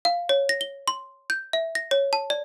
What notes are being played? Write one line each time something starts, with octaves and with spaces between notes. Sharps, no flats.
F5
C#5
A#6
G7
C6
G6
E5
A#6
C#5
A5
D5